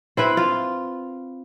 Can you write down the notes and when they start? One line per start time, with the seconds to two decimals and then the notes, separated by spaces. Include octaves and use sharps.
0.17 C4 E4 B4
0.37 F4